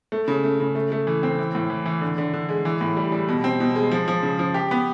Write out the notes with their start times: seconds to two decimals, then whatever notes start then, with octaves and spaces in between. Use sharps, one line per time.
0.12 A3
0.28 C#3
0.44 A3
0.60 C#3
0.75 A3
0.92 A3
1.07 E3
1.23 C4
1.38 E3
1.55 A2
1.70 E3
1.86 E3
2.01 D3
2.18 D3
2.34 D3
2.49 G#3
2.65 E3
2.81 A2
2.97 G3
3.12 G3
3.28 B2
3.44 C4
3.60 B2
3.75 G#3
3.91 F3
4.08 F3
4.23 C#3
4.39 F3
4.54 G4
4.71 B3